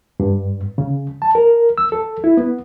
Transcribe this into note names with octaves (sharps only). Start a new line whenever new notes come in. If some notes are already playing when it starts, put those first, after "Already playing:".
G2
C#3
A5
A#4
E6
A4
E4
B3